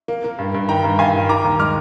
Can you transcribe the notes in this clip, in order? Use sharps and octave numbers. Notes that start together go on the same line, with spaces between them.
A#3
A#3
G2
G2
D#3 G5 A#5
G2
G2 F5 G#5
D#3
D#3 A#5 D6
D#2
G#3 D6 F6